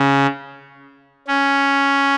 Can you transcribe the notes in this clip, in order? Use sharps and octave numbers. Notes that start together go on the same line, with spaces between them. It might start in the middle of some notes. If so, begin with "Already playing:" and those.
Already playing: C#3
C#4